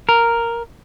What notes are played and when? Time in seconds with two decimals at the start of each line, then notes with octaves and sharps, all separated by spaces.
0.09 A#4